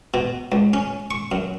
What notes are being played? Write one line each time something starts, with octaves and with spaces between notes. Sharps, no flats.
B2
C#2
C#4
C#6
F#2